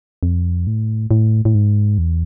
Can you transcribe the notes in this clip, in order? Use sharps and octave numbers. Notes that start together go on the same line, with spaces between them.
F2
A2
A2
A2
G#2
E2